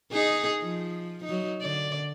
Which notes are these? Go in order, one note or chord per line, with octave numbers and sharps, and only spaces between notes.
D#4 G#4
F3
F#3 D#4
D3 D5